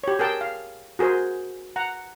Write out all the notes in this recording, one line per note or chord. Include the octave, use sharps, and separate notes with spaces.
G4 C#5
G#4 A#4 G5 A5
F5
F#4 G#4 A#4 C5
F#5 A#5